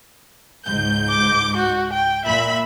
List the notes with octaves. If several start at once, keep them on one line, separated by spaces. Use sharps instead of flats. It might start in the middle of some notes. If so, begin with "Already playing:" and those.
C#2 G#2 G6
D6
F#4
G5
A#2 E5 B5 E6